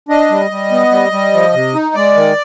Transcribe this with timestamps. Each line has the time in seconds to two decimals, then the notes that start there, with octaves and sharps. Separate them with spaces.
0.09 D4 D#5
0.30 G3
0.51 G3
0.71 B3
0.91 G3
1.12 G3
1.34 F3
1.54 C3
1.75 D#4
1.95 G#3 D5
2.15 D#3